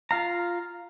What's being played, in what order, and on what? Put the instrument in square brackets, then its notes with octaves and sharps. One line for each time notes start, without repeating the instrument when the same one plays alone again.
[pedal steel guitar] F4 F5 A#5